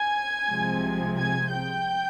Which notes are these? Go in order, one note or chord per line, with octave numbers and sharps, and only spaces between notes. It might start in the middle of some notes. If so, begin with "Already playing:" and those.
Already playing: G#5 G#6
C2 C3 F3 G#3
G#5 G#6
G5 G6